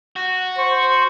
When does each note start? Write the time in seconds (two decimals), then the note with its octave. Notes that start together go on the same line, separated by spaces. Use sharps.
0.16 F#4
0.58 C5 C#6